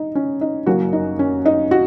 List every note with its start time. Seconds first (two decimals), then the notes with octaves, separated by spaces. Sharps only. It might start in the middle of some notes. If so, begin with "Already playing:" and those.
Already playing: D#4
0.15 C#4
0.41 D#4
0.66 F#1 F#2 F#3 A#3 F#4
0.93 D#4
1.19 C#4
1.46 D#4
1.71 F#4